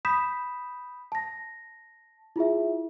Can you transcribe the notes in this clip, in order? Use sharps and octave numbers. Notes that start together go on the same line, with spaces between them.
B5 D#6 G6 B6 E7
A5 A#6
E4 F4 G#4 E5